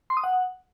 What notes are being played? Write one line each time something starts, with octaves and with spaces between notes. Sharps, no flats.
C6
D#6
F#5